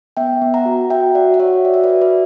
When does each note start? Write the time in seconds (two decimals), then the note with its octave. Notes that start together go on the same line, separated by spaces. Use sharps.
0.17 B3 E5 G5
0.42 B3
0.54 F#5 A#5
0.66 F#4
0.90 F#4 E5 G5
1.15 F#4 D5 F#5
1.34 F#5
1.40 F#4 C#5 E5
1.64 F#4 D5
1.74 E5
1.84 B4 D5
1.89 F#4
2.01 B4 D5